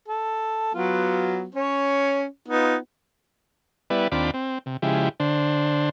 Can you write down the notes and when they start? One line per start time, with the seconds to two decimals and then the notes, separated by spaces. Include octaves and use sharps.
0.08 A4
0.74 F#3 B3 F4
1.55 C#4 C#5
2.49 B3 D#4 F4
3.90 G3 B3 E4 B4 D5
4.12 D#2 C4 D4 F4 B5 D6
4.34 C4
4.66 C3
4.82 C#3 F3 G#3 E4 G4
5.20 D3 D4 C5